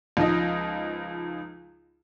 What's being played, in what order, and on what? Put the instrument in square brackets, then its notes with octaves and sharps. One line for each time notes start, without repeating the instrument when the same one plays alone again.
[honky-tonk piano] C#2 F3 D#4 D#5